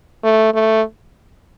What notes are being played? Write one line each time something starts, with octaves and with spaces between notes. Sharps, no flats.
A3
A3